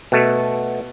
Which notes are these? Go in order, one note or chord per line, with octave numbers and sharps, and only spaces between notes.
B2 A3